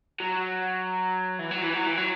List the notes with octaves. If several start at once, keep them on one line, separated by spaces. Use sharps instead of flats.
F#3
E3
F#3
E3
F#3
E3
F#3